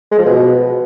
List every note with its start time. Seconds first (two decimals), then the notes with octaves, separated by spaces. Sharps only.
0.11 G#3
0.18 F3
0.25 B2